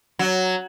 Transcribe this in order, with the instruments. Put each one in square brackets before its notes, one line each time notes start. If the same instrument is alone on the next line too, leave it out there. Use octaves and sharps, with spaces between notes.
[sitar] F#3